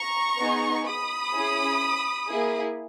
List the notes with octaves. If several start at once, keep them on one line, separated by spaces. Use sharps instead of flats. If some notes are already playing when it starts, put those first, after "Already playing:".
Already playing: A#5 C#6
B3 D#4 G#4
B5 D#6
C#4 E4 G#4
A#3 E4 G#4